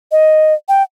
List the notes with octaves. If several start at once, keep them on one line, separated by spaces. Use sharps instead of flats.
D#5
G5